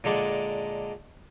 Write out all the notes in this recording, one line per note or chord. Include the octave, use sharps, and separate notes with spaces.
A#2 D3 G#3 D4